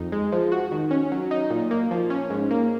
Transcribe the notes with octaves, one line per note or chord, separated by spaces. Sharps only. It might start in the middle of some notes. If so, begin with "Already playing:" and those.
Already playing: F2 D#4
G#3
F3
F#4
D#3
C#4
F#3
D#4
A#2
A#3
F3
C#4
G#2
A#3